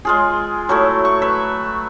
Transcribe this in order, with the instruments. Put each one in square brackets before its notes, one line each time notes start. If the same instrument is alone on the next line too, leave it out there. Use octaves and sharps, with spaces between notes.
[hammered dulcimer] G#3 F4 G#4
F#3 A3 E4
C#6
B4 E5